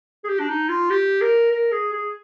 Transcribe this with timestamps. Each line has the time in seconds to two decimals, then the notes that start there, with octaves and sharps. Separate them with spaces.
0.24 G#4
0.29 G4
0.40 D4
0.49 D#4
0.69 F4
0.90 G4
1.21 A#4
1.51 A#4
1.72 G#4
1.93 G#4